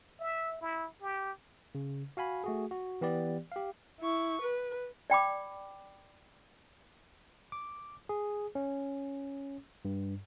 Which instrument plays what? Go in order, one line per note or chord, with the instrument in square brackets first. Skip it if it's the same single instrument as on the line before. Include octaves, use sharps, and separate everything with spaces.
[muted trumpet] E5
E4
G4
[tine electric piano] C#3
F#4 F5 G#5 B5
A3 F#4 G#4
F#4
E3 B3 G4 D5
G4 F5
[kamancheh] E4 C#6
B4
[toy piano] D5 G5 B5 D6
[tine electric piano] D6
G#4
C#4
G2